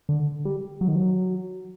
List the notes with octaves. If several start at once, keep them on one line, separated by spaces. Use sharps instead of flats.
D3
G3
F#3
D#3
F#3